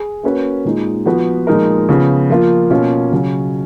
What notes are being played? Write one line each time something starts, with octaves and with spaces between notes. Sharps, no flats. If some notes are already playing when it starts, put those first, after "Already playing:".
Already playing: G#4
A#3 C#4 F#4 B4
A#2 G#3 D#4
F3 B3 F#4 B4
A#2 F3 G#3 D#4 A#4
C#3 F3 B3
F3 A#3 F4
B2 A#3 C#4 F4
C#3 F#3 C#4